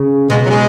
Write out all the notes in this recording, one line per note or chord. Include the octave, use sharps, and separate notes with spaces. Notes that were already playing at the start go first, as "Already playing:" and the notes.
Already playing: C#3
B2 G#3
F#3
G#3